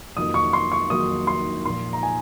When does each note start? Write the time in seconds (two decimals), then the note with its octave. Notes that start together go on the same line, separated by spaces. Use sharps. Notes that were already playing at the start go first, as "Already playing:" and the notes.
0.16 F2 D#3 F#3 A#3 D#6
0.34 C#6
0.53 C6
0.72 C#6
0.90 F2 D#3 F#3 A#3 D#6
1.27 C6
1.65 A#2 F3 A#3 C6
1.93 A#5
2.03 G#5